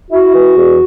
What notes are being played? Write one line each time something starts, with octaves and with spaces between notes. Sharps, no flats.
E4 F#4
E3
E2